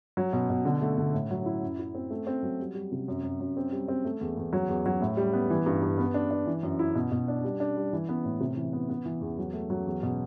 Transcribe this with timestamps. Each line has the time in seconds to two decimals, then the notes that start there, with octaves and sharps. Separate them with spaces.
0.17 F#3
0.33 B2
0.50 B2
0.65 D3
0.82 A3
0.98 D3
1.14 A2
1.31 F#3
1.46 E4
1.63 F#2
1.79 E4
1.95 C4
2.11 A3
2.27 C4
2.43 F#3
2.60 G3
2.75 G3
2.92 C3
3.08 F#2
3.24 F#2
3.40 F#2
3.57 C4
3.72 G3
3.88 C4
4.05 A3
4.21 E2
4.38 E2
4.53 F#3
4.69 E2
4.86 F#3
5.01 A2
5.17 G3
5.33 B3
5.50 E3
5.66 G2
5.83 G2
5.98 B3
6.14 D4
6.31 D4
6.47 E3
6.63 F#2
6.79 E4
6.95 B2
7.11 B2
7.28 D4
7.44 G3
7.60 D4
7.77 G3
7.93 E3
8.09 B3
8.25 A2
8.40 C3
8.57 E3
8.73 B3
8.89 B3
9.05 E3
9.21 E2
9.38 F#3
9.53 A3
9.70 F#3
9.86 E2
10.03 B2